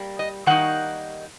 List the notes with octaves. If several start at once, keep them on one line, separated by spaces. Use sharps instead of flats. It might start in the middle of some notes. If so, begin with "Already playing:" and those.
Already playing: G3 A#3
D#5
D#3 G3 A#3 D#4 F#5